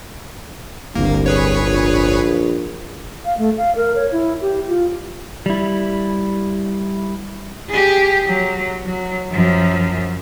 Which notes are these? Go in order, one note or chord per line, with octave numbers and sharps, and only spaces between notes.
D1 G1 C2 D3 A#3
G#4 B4 C#5
A#1
F5
A3
F5
A#4
C#5
E4
G4
F4
G3 E4
G4 G#4
F#3
F#3
F#2 F3